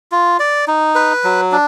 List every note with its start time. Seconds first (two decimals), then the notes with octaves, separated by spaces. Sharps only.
0.12 F4
0.39 D5
0.67 D#4
0.95 B4
1.24 F#3
1.52 D4